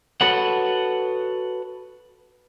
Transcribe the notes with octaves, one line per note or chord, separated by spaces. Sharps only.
F#4 A4 B4 C#5 F#5